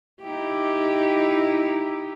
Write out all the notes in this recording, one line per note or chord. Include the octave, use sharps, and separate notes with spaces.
D#4 E4 G4